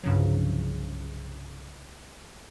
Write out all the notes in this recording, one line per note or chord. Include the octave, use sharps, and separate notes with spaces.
C2 G2 C#3 F3 F#3